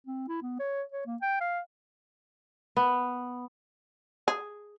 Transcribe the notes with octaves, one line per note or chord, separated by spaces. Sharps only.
C4
E4
B3
C#5
C#5
A#3
G5
F5
B3
G#4